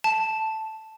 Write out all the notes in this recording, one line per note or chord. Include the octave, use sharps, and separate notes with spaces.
A5